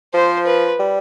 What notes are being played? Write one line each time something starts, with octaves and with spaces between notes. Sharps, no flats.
F3 C5
B4
G3